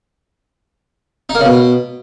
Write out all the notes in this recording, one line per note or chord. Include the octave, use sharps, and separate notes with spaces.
D#4
A#3
C#3
B2